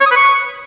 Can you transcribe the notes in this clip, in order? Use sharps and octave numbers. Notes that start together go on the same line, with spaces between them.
C#5
D#6
B4
C#6